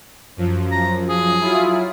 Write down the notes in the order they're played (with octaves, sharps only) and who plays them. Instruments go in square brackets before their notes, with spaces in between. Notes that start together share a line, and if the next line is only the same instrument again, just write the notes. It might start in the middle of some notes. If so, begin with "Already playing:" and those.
[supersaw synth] F#2 F3
[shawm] A#5
G#4
[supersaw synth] F#3 E4 F4